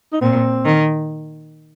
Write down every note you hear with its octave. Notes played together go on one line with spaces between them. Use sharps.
D#4
A#2 C4
D#3